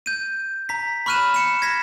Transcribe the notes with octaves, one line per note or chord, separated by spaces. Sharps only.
G6 D#7
A#5 B6
B5 C#6 F6 F#6 D#7 E7
C#7 E7
G#6 A#6 B6 E7